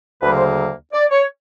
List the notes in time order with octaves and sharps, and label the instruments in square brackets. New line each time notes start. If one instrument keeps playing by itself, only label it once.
[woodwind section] D2 C#3 F#3 A#3 B4
C5
D5
C#5